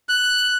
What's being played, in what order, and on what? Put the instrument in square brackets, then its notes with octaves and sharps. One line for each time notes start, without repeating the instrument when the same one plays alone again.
[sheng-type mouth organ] F#6